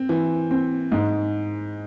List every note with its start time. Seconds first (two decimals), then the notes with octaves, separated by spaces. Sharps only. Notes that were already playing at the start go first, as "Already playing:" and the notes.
Already playing: C4
0.09 E3
0.51 C4
0.92 G#2